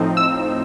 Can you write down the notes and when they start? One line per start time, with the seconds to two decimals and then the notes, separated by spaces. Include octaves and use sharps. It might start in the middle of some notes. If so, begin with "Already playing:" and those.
Already playing: A2 F3 C4 D#4
0.17 E6